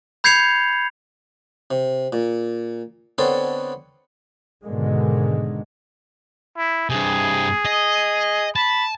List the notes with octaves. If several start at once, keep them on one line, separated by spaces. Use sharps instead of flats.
B5 G6 G#6 C7 C#7 F7
C3
A#2
D3 B3 C4 A4 C#5 C6
G#2 B2 D3 D#3 G#3
E4
G2 C3 G#4
D#5
A5 B5